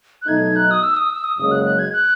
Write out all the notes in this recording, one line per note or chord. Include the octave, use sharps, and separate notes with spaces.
F#6
B2 F#3 A3 D#4 G#6
F#6
D#6
E6
D#6
E6
D#6
F#1 F#2 C#3 G#3 D#6
F#6
F#6
G#6
F#6